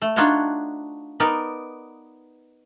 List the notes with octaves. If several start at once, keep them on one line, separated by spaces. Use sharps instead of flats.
A3
D4 D#4 F4 F#4 C#5
B3 D#4 A#4 D5